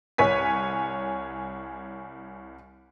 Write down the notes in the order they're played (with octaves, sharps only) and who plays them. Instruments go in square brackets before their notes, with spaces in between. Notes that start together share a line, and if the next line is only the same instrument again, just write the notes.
[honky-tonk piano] C2 C#5 G#5 B6